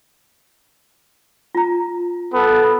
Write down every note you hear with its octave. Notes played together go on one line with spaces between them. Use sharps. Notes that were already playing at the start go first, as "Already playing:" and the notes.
F4 A#5
B3 A4